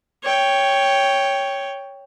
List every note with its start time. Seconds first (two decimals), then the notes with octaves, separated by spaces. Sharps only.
0.23 C#5 G5